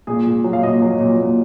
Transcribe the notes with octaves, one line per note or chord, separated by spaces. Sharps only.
A#2 G#4
A#2
F#3
F5
A#2 D#5
F#3
A#2
A#2